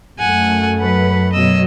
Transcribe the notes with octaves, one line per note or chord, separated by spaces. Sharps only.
F#2 A3 F#5 G#5
F#3 B4 F#5
B2 F#3 D#5 E6